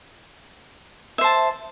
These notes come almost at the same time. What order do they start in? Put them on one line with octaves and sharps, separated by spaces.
E5 C5 A5